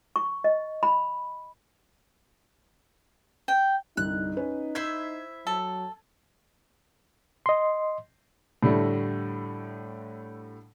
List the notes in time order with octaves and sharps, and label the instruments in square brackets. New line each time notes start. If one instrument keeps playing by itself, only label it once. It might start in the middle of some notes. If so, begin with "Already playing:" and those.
[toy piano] C#6
D#5
B5
[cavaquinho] G5
[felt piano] C2 G2 D3 [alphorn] D#4 [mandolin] F#6
[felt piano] C#4 B4
[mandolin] E4 C5 E5 [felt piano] G#6
[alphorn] F#3 [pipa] A4
[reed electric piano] D#5 C6
[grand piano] A2 D3 G3 A3